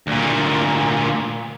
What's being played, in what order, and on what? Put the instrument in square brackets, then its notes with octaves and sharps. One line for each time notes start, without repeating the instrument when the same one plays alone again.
[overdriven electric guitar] D2 A#2